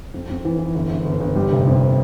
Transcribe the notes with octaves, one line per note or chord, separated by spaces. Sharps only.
F2
F2
E3
E3
G1
G1
G1
G1
G3
F1
F2